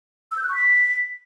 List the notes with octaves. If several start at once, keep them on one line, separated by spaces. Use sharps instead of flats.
E6
G6
F#6
C#6
B6